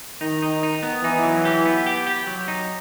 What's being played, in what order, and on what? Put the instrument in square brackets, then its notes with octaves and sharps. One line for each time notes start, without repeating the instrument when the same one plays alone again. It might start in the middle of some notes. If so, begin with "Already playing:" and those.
[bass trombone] D#3 [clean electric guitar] D#4
[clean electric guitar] D#4
D#4
B3
[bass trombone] E3 [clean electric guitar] D#4
[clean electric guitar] F#3
G4
B3
G4
G4
F#3
D#4